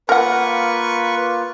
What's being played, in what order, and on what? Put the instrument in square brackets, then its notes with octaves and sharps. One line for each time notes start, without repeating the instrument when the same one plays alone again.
[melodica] A#3 F4 [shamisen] A#4 F#5 [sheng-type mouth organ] B4 C#6